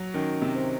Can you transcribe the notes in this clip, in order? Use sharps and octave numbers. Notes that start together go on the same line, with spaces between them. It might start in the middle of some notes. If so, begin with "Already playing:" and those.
Already playing: F#3 F#4
D#3 C#4
C3
C5